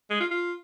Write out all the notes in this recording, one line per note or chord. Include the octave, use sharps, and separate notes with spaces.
G#3
F4
F4